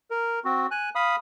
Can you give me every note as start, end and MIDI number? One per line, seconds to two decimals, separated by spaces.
0.11 0.39 70
0.45 0.67 60
0.45 0.67 66
0.71 0.90 80
0.71 0.90 90
0.95 1.16 77
0.95 1.16 83
0.95 1.16 87